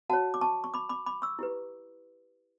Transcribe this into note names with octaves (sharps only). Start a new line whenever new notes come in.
F#4 C#5 F#5 A5
D6
A5 C#6
C#6
B5 D6
B5 D6
B5 D6
C#6 E6
E4 G4 B4